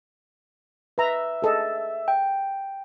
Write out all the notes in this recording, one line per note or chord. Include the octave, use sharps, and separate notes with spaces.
B4 E5 A#5
G#4 A4 D#5
G5